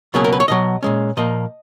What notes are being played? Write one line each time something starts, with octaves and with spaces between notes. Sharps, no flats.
C#2 B2 F#3 A#3 C#4 G#4
A#4
B4
C#5
B1 B2 F#3 D#5
A#2 G#3 C#4
A#2 F3 A#3 D#5